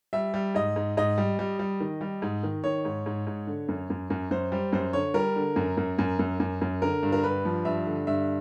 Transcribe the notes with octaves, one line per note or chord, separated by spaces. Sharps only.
G3 E5
G3
G#2 D#5
G#2
G#2 D#5
G3
G3
G3
D#3
G3
G#2
D#3
D#3 C#5
G#2
G#2
G#2
D3
F#2
F#2
F#2
F#2 C5
G3 C5
F#2 C5
D3 C#5
G3 A#4
D3
F#2
F#2
F#2
F#2
F#2
F#2
D3 A#4
G2
A#4
G2 B4
F3
G2 E5
D3
G2 E5